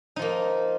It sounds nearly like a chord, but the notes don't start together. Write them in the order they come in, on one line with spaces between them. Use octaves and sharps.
D#4 F3 A#3